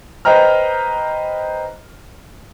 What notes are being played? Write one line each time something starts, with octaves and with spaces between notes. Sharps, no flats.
B4 C5 D#5 G5 A#5 F6